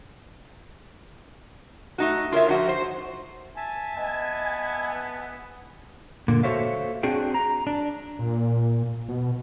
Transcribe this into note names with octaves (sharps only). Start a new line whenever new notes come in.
A3 D#4 F#4
F4 A#4 C#5 E5
F3 D#4 F#4
C5
E5 G#5 A5
B3 D#5 G#5
A#2 D3 A#3
F#4 A4 C5 C#5 E5 F5
C4 D4 F#4 G#4 G5
A#5
D4
A#2
B2